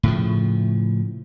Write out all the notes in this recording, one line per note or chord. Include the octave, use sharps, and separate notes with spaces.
A2 C#3 F3